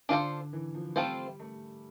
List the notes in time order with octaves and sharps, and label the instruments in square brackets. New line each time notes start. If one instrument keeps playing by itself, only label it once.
[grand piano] D3 [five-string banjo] D4 F4 A4 C5
[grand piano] E3
F3
[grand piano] G3 [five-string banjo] A3 C4 F4 A4 C5
[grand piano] A3